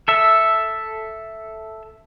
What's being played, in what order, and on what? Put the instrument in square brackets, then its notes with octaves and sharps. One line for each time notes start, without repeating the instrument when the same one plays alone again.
[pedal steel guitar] A4 E5